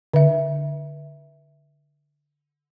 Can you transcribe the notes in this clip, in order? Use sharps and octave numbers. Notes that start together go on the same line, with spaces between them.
D3 E5